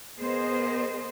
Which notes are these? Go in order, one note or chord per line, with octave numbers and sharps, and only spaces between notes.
B3 G#4 A#4 C5 D#5